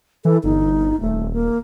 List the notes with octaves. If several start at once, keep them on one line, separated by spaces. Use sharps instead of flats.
E3 A4
G1 D#4
D#1 A3
A#3